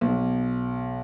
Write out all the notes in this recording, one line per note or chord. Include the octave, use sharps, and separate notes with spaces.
B1